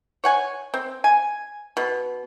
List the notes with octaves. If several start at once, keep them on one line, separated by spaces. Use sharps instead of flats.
C#5 F#5 G#5
C4
G#5
B2